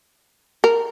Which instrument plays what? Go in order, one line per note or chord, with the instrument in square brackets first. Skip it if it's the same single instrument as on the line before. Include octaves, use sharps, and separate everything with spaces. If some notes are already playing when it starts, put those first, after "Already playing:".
[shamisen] A#4